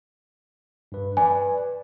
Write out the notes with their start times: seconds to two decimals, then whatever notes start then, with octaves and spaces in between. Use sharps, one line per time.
0.92 G2 B4
1.17 B4 D5 G#5